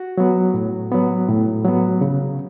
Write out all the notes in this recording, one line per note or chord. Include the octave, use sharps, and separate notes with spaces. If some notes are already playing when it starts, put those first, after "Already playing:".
Already playing: F#4
F#3 B3
A2
F#3 B3
A2
F#3 B3
C#3